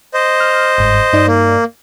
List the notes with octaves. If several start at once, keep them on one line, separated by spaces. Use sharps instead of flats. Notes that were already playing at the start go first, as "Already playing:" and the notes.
C5 D#5
F6
G1 G#2
G2 D#4 D5
A#3